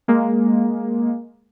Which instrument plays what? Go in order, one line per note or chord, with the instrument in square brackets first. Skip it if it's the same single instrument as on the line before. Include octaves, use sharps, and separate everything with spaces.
[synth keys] G#3 A#3